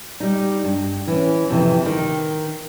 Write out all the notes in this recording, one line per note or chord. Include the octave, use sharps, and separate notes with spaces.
G3 D#4
G2
E3 C#4
F2 C3 E3
D#3 D#4